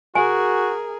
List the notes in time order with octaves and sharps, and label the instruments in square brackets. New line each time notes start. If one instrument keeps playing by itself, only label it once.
[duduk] F#4 [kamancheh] G#4 A#4 [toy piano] G#5